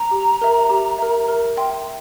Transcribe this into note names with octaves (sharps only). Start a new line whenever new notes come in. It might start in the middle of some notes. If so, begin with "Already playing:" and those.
Already playing: A#5
G4
A#4 E5
G4
A#4 E5
A#4
E5 G5 C6